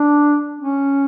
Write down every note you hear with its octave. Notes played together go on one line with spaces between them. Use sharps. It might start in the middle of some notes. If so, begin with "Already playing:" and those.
Already playing: D4
C#4